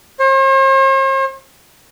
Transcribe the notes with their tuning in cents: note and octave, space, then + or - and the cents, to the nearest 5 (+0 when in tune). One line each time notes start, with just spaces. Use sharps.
C5 +45